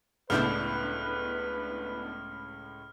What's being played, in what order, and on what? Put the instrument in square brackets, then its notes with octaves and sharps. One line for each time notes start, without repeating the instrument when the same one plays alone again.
[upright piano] C#2 A2 G6 [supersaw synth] B3 D4 E4 [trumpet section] B4 [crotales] F6